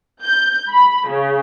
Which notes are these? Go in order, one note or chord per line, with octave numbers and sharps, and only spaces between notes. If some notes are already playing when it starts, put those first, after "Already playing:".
G6
B5
C#3